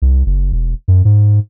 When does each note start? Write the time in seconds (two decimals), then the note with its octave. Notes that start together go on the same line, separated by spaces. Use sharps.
0.02 C2
0.26 F#1
0.52 E1
0.88 F#2
1.05 G#2